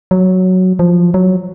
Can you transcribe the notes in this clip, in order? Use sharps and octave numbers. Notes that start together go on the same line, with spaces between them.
F#3
F3
F#3